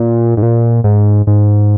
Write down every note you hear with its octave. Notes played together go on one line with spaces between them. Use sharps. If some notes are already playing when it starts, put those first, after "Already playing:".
Already playing: A#2
G#2
A#2
G#2
G#2